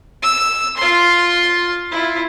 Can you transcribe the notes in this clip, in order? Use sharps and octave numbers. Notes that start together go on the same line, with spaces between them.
E6
F4 C6
E4 F4